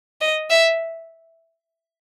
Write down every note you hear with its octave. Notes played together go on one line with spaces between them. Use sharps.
D#5
E5